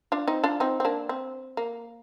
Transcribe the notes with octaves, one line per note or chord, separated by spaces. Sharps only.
D4 F4
C4 D#4
D4 F4
C4 D#4
C4
A#3 D4
C4
A#3